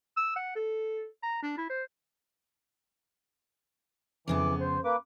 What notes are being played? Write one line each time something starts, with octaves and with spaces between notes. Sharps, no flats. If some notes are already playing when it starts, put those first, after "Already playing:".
E6
F#5
A4
A#5
D4
E4
C5
F2 C#3 E3 B3 D6
C5
A#3 B4 D6